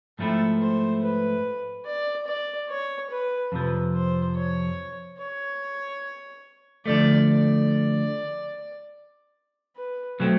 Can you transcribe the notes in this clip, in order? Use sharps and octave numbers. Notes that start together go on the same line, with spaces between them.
G#2 F3 A3 C4 E4 A4
C5
B4
D5
D5
C#5
B4
F2 C3 F3 B4
C5
C#5
C#5
D3 F3 A3 D5
D5
B4
B2 F#3 A3 C4